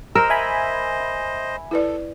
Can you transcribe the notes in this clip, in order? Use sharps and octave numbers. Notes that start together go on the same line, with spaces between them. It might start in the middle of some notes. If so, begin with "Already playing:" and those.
A#4 C5 D#5 E6
E5 G#5 B5
E4 A4 B4 D5